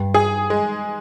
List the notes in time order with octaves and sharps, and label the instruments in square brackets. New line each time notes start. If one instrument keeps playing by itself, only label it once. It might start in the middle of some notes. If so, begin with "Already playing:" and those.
Already playing: [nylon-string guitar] G2
[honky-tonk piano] G#4
G#3